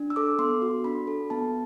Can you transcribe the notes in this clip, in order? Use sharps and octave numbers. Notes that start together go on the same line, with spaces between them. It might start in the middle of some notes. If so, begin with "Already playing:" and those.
Already playing: D4
E6
A4 D6
B3 C6
F#4
D4 B5
A4
B3 A5